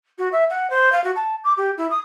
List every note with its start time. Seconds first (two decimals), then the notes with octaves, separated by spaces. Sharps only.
0.18 F#4
0.32 E5
0.50 F#5
0.70 C5
0.92 F5
1.04 F#4
1.15 A5
1.44 D6
1.57 G4
1.77 E4
1.90 D#6